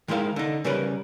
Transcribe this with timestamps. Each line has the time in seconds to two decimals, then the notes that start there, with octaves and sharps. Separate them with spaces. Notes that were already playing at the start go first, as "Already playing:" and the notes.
0.08 D#3 G#3 E4 A#4 F5
0.36 D3 D#4
0.64 C#3 G3 C#4 A#4 B4